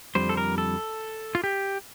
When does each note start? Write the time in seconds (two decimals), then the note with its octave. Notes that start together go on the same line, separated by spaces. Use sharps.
0.15 F2 D3 G3 C5
0.29 A4
0.37 A#4
0.58 A4
1.35 F4
1.44 G4